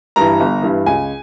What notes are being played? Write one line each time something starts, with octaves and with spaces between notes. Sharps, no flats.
G2 E3 A#5
G1
G2 E3
C#2 G#5